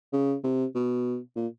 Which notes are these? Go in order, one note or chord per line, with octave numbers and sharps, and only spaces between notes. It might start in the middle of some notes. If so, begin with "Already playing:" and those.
C#3
C3
B2
A#2